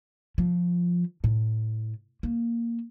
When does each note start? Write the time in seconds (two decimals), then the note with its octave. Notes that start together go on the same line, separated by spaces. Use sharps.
0.38 F3
1.24 A2
2.23 A#3